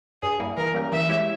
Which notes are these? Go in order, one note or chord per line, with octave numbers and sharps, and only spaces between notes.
G2 G#4
G3 A#3 E4
E3 A#4
G3 A#3 C#4 G4
E3 E5
G#3 E4 G4 C#5